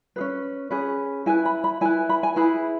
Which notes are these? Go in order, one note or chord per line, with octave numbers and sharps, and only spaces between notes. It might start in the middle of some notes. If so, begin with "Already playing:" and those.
C#4 G#4 B4
C#4 G#4 B4
E4 B4 G#5
B5
B5
E4 B4 G#5
B5
G#5
E4 G#4 B4 B5